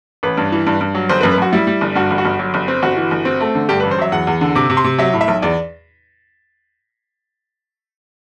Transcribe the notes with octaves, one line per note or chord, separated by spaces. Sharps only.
A1 B4
G2
E3
G2
G2
F#3
G1 C5
B4
F#2
B4
F#2 F#4
G3 E4
G3
G1
G2 F#4
G1
F#4
G1
F#3
G1
C4
G1 F#4
E3
G1
C4
A3
D3
G2 G4
B4
A1
C5
F#3 E5
E2 F#5
E2
D3
C3 D6
C3
C6
C3
F#3 E5
A2
E5
B1
E2 D5